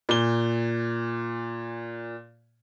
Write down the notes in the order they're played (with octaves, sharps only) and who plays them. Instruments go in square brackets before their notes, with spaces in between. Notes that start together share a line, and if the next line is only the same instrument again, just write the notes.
[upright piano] A#2 G7